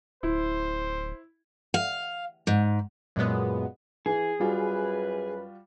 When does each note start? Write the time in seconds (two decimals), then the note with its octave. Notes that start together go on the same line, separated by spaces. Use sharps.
0.23 D1 E4 C5
1.74 F5
2.47 G#2
3.16 F#2 A#2 G#3 B3
4.06 E3 G#4
4.40 F#2 G3 F4 F#4 B4